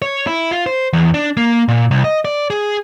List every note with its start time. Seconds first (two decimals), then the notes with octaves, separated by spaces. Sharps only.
0.02 C#5
0.27 E4
0.51 F4
0.66 C5
0.93 E2
1.14 D4
1.37 A#3
1.68 A#2
1.91 C2
2.04 D#5
2.25 D5
2.50 G#4